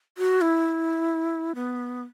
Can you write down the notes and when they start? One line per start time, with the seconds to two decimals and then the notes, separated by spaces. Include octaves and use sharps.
0.18 F#4
0.41 E4
1.55 B3